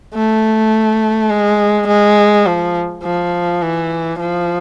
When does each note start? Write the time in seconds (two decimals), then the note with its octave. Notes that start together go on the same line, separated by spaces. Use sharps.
0.14 A3
1.30 G#3
1.88 G#3
2.46 F3
3.03 F3
3.62 E3
4.19 F3